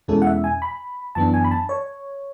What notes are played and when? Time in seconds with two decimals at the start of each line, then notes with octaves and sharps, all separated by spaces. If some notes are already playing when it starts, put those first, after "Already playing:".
0.08 E2 B2 G#3 C#4 E4 A4
0.22 F#5
0.27 E5
0.44 G#5
0.62 B5
1.15 F#2 E3 B3 D4 A5
1.34 G#5
1.44 B5
1.51 A5
1.69 C#5